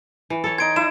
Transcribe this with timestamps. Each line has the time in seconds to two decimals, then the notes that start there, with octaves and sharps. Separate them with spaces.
0.30 E3
0.44 A4 C#5
0.58 D#4 C6 G#6 D7
0.76 D#4 E4 E7